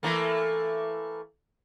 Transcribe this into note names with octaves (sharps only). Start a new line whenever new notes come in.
E3 A3 A#3